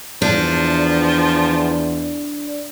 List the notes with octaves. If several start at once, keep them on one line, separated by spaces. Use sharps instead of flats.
E2 F3 D4